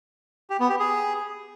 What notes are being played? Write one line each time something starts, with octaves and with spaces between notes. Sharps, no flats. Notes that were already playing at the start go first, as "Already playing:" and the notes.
G4
B3
G4
G#4